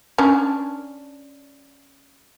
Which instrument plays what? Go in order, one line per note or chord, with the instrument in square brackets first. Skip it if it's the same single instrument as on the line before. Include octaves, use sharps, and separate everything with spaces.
[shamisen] C#4 D4